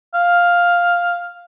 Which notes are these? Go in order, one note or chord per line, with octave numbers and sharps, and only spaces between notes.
F5